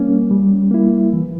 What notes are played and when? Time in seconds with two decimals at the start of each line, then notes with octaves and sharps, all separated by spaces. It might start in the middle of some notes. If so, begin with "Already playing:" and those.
Already playing: G3 A#3 C#4
0.31 G3
0.71 A#3 E4
1.13 E3